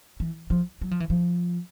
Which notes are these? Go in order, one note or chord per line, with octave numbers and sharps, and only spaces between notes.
E3
F3
F#3
F3
E3
F3